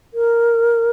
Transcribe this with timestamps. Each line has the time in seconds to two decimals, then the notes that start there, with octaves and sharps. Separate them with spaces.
0.14 A#4